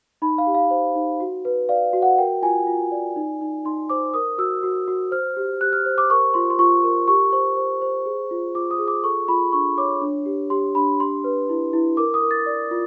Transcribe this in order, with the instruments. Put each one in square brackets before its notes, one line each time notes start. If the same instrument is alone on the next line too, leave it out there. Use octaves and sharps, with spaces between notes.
[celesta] D#4 B5
F5
G4
F5
C5
D#4
F#4
B4
D5 F5
F#4
F#5
A#4 G5
F4 G#5
F4
D5
D#4
D#4
D#4 C6
C5 D6
A#4 D#6
F#4 E6
F#4
F#4
C5 F6
G4
G4 F#6
F6
C5
D6
A#4 C#6
F4 C6
C6
F4 C#6
A#4
G4 C#6
C5 C#6
C5
C5
G#4
F4
F4 D6
D#6
G#4
D6
A4 C#6
F4 B5
D4 C#6
C#5 D6
D4
G4
G4 C6
D4 B5
G4 C6
B4
E4
E4
A#4 D6
D#6
A#4
A6
D5
F4